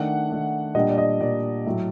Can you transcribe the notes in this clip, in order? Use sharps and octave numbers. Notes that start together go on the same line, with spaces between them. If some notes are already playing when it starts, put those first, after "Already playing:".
Already playing: D#3 A3 D4 F#5
D#3 A3 D4
A#2 G3 D4 D#5
D5
D#5
A#2 G3 D4 D5
A2 F#3 A3